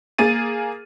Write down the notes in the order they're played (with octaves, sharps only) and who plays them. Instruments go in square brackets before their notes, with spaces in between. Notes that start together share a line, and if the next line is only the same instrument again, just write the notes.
[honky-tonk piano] A#3 G#4 A6 D#7